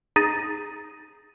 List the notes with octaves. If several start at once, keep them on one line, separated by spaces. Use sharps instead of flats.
D#4 G#4 A6 A#6 D#7